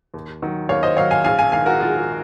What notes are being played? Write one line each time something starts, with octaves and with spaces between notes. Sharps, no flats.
D#2
D#3 F#3
D#2 C#5 F5
C5 D#5
D#3 F#3 C#5 F5
F5 G#5
A#1 F5 G#5
F5 G#5
G#2 D#3 F5 G#5
F#4 A#4
A#1 F4 G#4
F#4